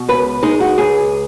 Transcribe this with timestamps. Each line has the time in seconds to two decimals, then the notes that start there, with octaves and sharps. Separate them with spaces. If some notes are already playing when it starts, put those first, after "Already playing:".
Already playing: B2
0.08 C#2 B4
0.43 G#3 D#4
0.60 F#4
0.78 C#2 G#4